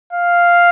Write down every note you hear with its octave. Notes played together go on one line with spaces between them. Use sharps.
F5